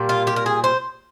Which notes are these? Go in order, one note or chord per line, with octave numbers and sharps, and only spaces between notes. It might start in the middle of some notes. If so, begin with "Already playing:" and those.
Already playing: A#2 G3 A#3
F4
G4
A#4
G#4
C5